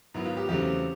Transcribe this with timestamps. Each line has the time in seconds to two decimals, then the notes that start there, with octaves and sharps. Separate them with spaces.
0.14 G#2 D#3 F#3 B3 E4
0.26 F4
0.37 G4
0.49 E2 C#3 F#3 A3 C4 G4